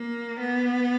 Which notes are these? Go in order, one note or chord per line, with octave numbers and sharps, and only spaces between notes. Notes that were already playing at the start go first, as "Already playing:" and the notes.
Already playing: A#3
B3